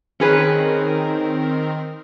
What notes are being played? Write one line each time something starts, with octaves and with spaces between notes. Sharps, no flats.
D#3 C4 C#4 G#4 A#4 B4